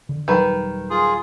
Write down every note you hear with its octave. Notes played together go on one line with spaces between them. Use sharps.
D3
D#1 D#3 F#3 G3 B4
F4 G#4